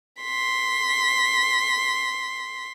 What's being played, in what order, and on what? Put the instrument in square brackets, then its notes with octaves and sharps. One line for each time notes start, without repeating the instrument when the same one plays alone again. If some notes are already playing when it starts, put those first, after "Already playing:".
[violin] C6 B6